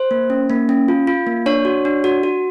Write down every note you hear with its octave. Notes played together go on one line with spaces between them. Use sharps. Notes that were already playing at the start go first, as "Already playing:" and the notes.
Already playing: C5
A#3
C#4
A#3
C#4
F4
F4
A#3
D4 C#5
F#4
D4
F#4
F#4